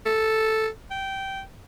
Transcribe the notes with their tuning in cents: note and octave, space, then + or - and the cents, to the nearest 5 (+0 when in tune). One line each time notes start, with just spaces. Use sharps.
A4 +0
G5 -15